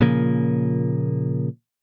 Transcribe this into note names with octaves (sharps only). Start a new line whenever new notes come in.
A#2 C#3 F3 A#3